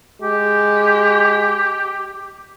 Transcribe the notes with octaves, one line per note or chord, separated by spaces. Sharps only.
G#3 G4